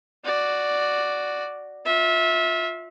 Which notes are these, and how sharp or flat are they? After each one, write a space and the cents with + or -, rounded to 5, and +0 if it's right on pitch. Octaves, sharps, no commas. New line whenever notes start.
F#4 +0 D5 +0
F4 +20 E5 -20